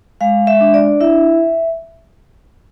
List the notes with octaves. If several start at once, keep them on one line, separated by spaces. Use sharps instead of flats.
G#3 F5
E5
D4
D5
E4 E5